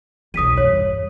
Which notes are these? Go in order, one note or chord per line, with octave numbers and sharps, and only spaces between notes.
B1 E2 D#6 B6 D#7
E2 G2 C#5